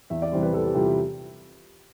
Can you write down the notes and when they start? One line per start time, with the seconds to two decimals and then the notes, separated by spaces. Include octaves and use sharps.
0.10 E2 E5
0.22 D5
0.32 C3 E3 G3 C5
0.43 B4
0.53 E2 A4
0.65 G4
0.75 C3 E3 G3 F4
0.87 G4